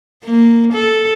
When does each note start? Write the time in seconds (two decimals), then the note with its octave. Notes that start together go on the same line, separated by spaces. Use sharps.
0.24 A#3
0.73 A4